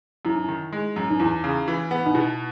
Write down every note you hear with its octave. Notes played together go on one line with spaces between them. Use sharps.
F#2 E4
D#4
E4
D#3
G#3
F#2
D#4
E2 E4
C#3
E3
B3
D#4
B2 E4